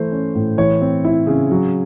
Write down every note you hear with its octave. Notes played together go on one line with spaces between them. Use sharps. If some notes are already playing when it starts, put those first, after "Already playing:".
Already playing: E3 A3 C5
C#4
A2
E3 C#5
C4
E4
C#3
F#3